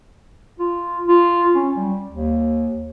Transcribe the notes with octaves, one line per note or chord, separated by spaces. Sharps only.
F4
F4
C#4
G3
D#2